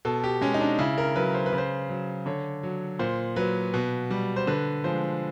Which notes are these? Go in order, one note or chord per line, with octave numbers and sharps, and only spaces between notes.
B2 A4
G4
G#3 C#4
D#4
D4
C#3 E4
A#4
F#3 B4
C5
B4
C#3
C5
F#3
D3 C#5
F#3
A#2 C5
F#3 B4
B2
G3
C5
D3 B4
F3 G#3 C5